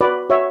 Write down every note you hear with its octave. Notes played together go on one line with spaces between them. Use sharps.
F#4 B4 D5
F#4 C#5 E5